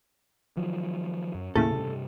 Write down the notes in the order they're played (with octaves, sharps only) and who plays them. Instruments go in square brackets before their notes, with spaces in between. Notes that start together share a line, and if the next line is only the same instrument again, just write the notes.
[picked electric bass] D#3 F3 F#3
F#2
[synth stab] D#2 A2 C#3 [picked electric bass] A#3 [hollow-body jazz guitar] A4
[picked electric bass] G2 C3